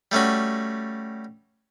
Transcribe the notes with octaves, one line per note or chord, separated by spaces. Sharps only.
G3 A3 C#4 F#4